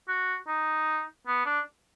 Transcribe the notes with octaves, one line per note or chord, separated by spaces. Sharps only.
F#4
D#4
B3
D4